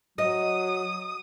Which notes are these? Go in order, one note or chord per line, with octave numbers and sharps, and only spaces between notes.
F#3 D#5 D#6